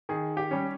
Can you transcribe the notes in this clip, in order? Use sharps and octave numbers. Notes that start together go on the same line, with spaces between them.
D#3 G#4
G4
G3 C#4